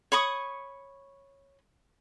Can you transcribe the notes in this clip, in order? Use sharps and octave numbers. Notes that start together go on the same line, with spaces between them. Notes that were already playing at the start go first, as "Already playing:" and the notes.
C#5 B5 C#6 D#6